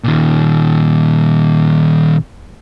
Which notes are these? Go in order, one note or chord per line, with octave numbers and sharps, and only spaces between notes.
A#2 D#3